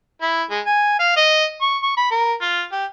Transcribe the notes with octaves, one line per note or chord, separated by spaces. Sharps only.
E4
G#3
G#5
F5
D#5
C#6
C#6
B5
A#4
F4
G4